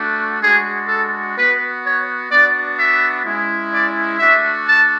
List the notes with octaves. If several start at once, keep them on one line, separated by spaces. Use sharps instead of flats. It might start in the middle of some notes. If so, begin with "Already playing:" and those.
Already playing: A3 D4 F#4
G#3 D4 F#4 G#4
A4
B3 F#4 B4
C#5
B3 D4 F#4 D5
E5
G#3 C#4 E4
D5
A3 D4 F#4 E5
A5